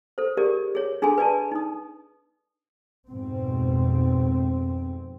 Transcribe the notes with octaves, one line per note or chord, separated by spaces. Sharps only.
A4 C5
G4 G#4 A#4 D5
G#4 C#5
D4 G#4 A4 G#5 C6
B4 D5 G#5 A5
D#4 D#6
F2 G#2 B2 C4